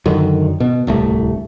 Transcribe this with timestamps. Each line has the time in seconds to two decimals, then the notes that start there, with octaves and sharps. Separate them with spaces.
0.06 F#2 D3 D#3
0.60 B2
0.87 D1 C2 A3